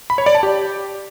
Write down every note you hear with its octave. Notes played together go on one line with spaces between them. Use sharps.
B5
C#5
D5
A5
G4